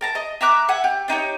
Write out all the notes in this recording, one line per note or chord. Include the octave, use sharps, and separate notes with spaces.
A#4 A5 A#5
D#5
E5 A#5 D6 F#6
E5 F#5 G#5
G4
D4 D#4 G4 C#5